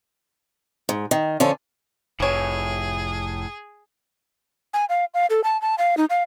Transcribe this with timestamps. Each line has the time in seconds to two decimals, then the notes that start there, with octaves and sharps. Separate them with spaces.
0.89 G#2
1.11 D#3
1.40 D3 F3 C#4 A4
2.20 F1 A2 E3 G#4 C#5
4.74 G#5
4.89 F5
5.14 F5
5.30 A4
5.44 A5
5.62 A5
5.78 F5
5.97 D#4
6.10 F5